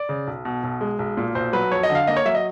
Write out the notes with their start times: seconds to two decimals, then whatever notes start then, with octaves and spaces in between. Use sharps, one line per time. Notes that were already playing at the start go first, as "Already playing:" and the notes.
Already playing: D5
0.09 C#3
0.27 B1
0.45 B2
0.63 B1
0.81 G#3
0.99 B1
1.17 A#2
1.35 B1 C5
1.53 F#3 B4
1.71 F2 C#5
1.83 D#5
1.90 D3
1.95 F5
2.07 A#3 D#5
2.17 C#5
2.25 F#3 E5
2.35 D#5